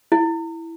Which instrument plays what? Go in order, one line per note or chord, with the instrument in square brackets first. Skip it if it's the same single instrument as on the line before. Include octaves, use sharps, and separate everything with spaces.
[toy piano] E4